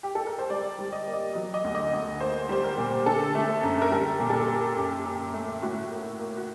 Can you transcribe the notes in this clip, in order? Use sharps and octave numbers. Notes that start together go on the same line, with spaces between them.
G4
A4
A#4
C5
G3 D5
G3
D#5
A#3
D#5
F#3 D#5
D#5
D2
D#5
D2 D#5
A#3 C5
G3 C5
A#4
A#2
D3 A4
A3
F#2
A#4
G3 A4
A#2
A4
A#4
A#3
F#2 G4
F#2
A3
A2 F#4
A#3
A#3
F#4